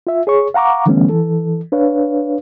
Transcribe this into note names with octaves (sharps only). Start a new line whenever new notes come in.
F4 E5
G#4 C#5 C#6
F5 F#5 A#5 C#6 D6
D3 E3 G3 A3 B3 C#4
E3 A4
D4 B4 C#5 F5